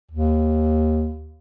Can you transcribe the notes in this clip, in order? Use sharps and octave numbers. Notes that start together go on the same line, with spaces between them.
D#2